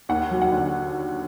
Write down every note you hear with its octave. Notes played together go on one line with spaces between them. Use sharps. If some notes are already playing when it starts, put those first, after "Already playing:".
D#2 F#5
F#3
F#5
D3